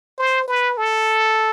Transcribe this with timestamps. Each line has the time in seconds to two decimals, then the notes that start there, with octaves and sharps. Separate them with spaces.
0.18 C5
0.48 B4
0.77 A4